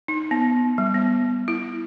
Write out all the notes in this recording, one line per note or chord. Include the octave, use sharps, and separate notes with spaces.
D#4
B3
G3
B3
E4